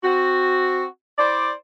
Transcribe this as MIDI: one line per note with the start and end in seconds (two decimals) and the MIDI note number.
0.04 0.84 60
0.04 0.84 66
1.18 1.52 64
1.18 1.52 72
1.18 1.52 74